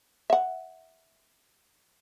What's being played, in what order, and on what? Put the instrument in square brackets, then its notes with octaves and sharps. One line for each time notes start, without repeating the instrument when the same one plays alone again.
[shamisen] E5 F#5